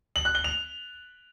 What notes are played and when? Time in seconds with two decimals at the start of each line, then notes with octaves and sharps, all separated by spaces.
0.16 F#7
0.25 F#6
0.35 G7
0.44 F7